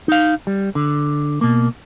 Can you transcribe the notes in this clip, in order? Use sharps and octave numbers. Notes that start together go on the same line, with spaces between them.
D#4 F5
G3
D3
B2 A#3